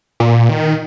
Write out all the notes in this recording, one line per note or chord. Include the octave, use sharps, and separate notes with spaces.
A#2
D#3